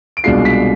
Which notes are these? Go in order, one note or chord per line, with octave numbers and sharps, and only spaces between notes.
D7
C2 B2 G#3 D4 F4 C7
B6